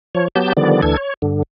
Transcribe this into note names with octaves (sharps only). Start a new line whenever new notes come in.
F3 C#5
F#3 B3 G4 A5 G6
D3 D#3 F3 G3 B3 D5
D2 E3 D4 A4 G#6
C#5
G2 D3